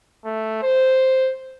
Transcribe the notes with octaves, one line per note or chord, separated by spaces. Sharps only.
A3
C5